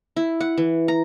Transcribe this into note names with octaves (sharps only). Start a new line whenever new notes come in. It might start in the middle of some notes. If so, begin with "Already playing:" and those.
E4
F#5
E3
A#5